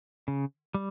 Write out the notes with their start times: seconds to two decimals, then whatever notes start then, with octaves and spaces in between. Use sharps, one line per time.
0.28 C#3
0.74 G3